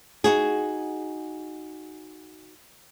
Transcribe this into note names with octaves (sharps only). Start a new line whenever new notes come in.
D#4 F#4 G#4